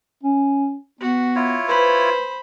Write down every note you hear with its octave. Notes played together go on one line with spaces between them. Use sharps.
C#4
B3 F#4
E4 F4 C#5
B4 C5 B5